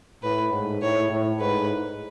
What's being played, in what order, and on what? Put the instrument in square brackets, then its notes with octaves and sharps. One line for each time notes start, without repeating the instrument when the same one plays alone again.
[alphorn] A2 [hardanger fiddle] B4
[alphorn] G#2
[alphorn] A2 [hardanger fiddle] C#5
[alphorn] A2
[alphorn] G#2 [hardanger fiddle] B4